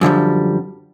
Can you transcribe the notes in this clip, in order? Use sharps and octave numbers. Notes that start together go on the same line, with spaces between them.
F#2 D3 F3 G3